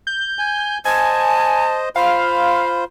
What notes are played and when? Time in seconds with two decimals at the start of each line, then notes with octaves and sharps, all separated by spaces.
0.07 G6
0.39 G#5
0.85 C5 D#5 G#5 A5
1.96 F4 C5 F5 B5